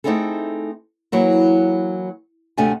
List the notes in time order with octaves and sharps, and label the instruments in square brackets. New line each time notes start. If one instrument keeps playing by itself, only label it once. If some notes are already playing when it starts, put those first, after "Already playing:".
[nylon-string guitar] A3 C4 D#4 E4 G#4 A4
E3 F#3 A#3 E4
D2 C3 A3 D4 G#5